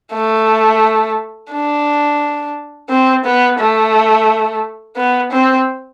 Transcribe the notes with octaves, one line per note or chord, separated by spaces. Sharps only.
A3
D4
C4
B3
A3
B3
C4